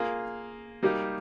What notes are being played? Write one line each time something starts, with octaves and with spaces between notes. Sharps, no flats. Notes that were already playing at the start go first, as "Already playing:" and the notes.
Already playing: A#3 F4 G#4
G3 A#3 D#4 G4